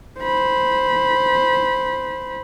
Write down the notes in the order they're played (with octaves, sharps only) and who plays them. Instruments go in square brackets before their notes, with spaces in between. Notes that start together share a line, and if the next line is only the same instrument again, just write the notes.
[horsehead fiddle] C5 B5